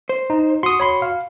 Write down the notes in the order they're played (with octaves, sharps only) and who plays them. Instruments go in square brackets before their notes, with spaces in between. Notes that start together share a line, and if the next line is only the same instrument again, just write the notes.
[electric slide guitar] C5
[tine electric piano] D#4
[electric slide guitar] F#4 [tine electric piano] C6 D#6
[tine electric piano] C#5 B5 C6
F5